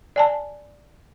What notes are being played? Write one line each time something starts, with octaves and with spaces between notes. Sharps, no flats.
D5 G#5 A5